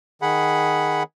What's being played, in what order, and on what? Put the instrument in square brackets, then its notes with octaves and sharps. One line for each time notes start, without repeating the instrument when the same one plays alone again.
[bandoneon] D#3 G#4 F#5 B5